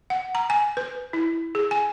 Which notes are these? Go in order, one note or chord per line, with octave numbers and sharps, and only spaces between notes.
F#5
A#5
G#5
B4
E4
G#4
G#5